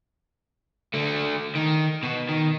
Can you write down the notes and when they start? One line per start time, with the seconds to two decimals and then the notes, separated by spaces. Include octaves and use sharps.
0.94 D3 A3
1.55 D#3
2.03 B2
2.29 D#3